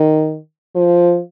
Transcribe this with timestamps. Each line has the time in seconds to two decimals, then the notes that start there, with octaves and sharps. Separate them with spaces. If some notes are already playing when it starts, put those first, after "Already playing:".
Already playing: D#3
0.75 F3